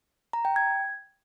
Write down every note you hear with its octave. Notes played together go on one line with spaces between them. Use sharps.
A#5
G5
G#6